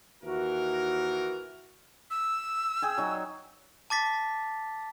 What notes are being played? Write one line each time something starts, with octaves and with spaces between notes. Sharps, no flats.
D#2 E3 F#4 A#4
E6
G#4 G5 G#5
F#3 D#4
A5 D6 A6 B6